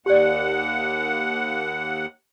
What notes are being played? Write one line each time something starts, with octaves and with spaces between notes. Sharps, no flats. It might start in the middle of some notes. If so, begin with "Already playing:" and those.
D#2 G4 D5 F#5